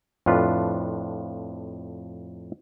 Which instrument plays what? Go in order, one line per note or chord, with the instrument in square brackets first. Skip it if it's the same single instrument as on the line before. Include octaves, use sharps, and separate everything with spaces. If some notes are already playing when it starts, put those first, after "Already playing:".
[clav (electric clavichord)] F2 A2 D4 F4 B4